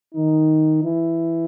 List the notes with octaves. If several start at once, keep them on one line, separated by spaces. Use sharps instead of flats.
D#3 D#4
E3 E4